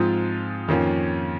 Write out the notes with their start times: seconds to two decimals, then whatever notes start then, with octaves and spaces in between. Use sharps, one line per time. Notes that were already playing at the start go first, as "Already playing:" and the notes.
Already playing: G#2 F3 C4 F4 G#4
0.68 F2 D#3 A#3 C#4 F4